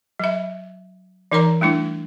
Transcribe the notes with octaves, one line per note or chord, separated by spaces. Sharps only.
F#3 E5
E3 D#4 A#4 C#5 D5 A#5
G3 A3 D4 E4